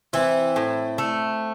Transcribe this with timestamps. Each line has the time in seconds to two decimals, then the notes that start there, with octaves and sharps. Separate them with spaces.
0.13 E3 C4 E4
0.56 A2
0.98 A3